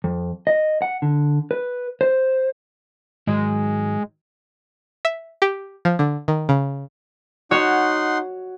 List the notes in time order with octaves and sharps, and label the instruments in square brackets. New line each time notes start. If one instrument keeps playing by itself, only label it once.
[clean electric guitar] F2
D#5
F#5
D3
B4
C5
[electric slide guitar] G#2 D#3 F#3 [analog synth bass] G#3
[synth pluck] E5
G4
F3
D3
D#3
C#3
[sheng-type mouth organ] D#4 F#5 C6 [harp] F#4 C#5